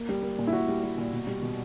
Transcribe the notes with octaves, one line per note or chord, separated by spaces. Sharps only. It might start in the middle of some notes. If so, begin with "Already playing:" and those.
Already playing: A#3
G3
A#3
A#2
E4
A#2 F#4
G3
G3
A#2
B2
G3
B2